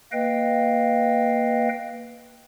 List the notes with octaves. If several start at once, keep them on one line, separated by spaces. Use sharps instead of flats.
A#3 B4 D#5 F5 G5